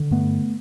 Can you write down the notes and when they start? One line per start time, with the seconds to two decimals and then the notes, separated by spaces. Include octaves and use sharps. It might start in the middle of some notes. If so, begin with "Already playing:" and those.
Already playing: D3
0.11 G2 A3 B3